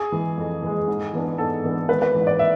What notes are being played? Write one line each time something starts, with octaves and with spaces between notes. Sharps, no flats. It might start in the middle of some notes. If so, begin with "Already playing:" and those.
Already playing: G#4
E3 G#3
F2
E3 G#3
G#2
E3 B3 D4
G#2 A4
E3 B3 D4
G#1 B4
B4
G#2 E3
D5
E5